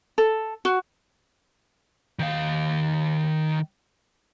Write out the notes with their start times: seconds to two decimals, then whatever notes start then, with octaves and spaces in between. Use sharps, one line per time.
0.18 A4
0.65 F#4
2.19 D#3 F5